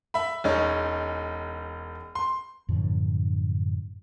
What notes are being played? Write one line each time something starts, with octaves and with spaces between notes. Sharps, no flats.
E5 B5
E1 C#4 D#4
C6
F#2 A2 D3 F3